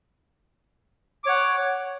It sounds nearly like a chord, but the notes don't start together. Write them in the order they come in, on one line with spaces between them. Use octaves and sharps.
D6 C#5 F#5